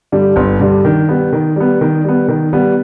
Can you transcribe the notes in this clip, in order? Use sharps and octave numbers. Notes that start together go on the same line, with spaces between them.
G2 D3 G3
G1
G2 D3 G3
D#3
G3 B3
D#3
G3 B3
D#3
G3 B3
D#3
G3 B3